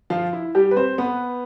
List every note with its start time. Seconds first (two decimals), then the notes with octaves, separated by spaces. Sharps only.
0.10 F3 F4
0.33 E4
0.55 G3 G4
0.71 B4
0.76 C4 C5
0.98 B3 B4